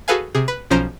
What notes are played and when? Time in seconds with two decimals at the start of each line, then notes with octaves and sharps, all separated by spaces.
0.08 F#4 G#4 A4 B4 F5 G#5
0.35 C3 G#4
0.48 B4
0.70 B1 F3 C#4 C5 A#5 D7